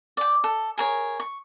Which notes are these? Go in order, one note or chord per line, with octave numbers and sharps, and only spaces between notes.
D5 G5
A4
G#4 A#4 C#5
C#6